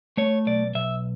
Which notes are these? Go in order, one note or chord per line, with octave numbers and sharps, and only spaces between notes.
A3 C#5
B1 D5
B1 E5